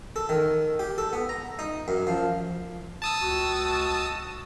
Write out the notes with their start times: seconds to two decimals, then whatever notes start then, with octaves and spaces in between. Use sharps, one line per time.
0.16 A4
0.29 D#3
0.79 G4
0.98 A4
1.13 B3
1.29 A#5
1.59 D#4
1.88 F#2
2.07 F3
3.02 A5 D#6 E6
3.22 C#2 F#4